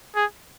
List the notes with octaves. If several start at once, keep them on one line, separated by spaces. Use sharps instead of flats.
G#4